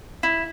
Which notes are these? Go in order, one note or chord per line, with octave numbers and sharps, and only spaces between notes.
E4